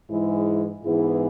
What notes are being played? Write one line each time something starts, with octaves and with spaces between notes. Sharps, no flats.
G#2 E3 G#3 E4 G#4
G#2 E3 B3 E4 G#4